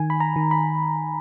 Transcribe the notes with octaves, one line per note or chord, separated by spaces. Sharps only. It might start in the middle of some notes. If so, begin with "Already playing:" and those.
Already playing: D#3 G#5
B5
A#5
D#3
B5